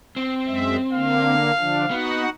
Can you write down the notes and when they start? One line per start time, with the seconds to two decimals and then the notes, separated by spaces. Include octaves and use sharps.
0.16 C4
0.47 F#2 G#3 E5
0.93 D3 A#3 F5
1.58 D3 F3 D4
1.91 B3 D#4 F#4 F#5